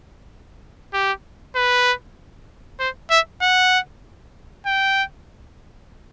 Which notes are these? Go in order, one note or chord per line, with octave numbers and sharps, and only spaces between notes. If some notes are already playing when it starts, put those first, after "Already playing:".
G4
B4
C5
E5
F#5
G5